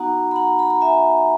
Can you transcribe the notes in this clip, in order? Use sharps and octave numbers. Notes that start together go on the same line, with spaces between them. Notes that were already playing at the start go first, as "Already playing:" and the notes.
Already playing: B3 D#4 F#4 F#5 A#5
B5
F#5 A#5
B5
A#5
E5 G#5